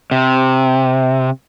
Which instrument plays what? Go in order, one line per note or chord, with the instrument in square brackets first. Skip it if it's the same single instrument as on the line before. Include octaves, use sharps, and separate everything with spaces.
[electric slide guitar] C3